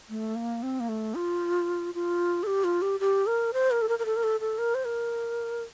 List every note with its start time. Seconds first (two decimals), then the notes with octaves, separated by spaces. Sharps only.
0.10 A3
0.36 A#3
0.63 C4
0.80 A#3
0.89 A3
1.15 F4
1.95 F4
2.43 A4
2.47 G4
2.64 F4
2.82 G4
3.00 G4
3.27 A#4
3.53 C5
3.71 A#4
3.82 A4
3.89 A#4
3.99 A#4
4.05 A4
4.16 A#4
4.23 A4
4.40 A4
4.58 A#4
4.75 C5
4.85 A#4